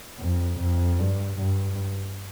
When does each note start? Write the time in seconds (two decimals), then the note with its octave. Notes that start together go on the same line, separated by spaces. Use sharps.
0.20 F2
0.59 F2
0.99 G2
1.38 G2